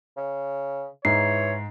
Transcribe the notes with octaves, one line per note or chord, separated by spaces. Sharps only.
C#3
G#2 E3 C#5 C7